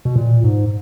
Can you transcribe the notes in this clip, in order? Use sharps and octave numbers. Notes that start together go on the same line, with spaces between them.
B2
A#2
G#2